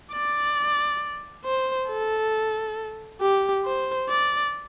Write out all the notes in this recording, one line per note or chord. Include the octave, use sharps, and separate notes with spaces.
D5
C5
A4
G4
C5
D5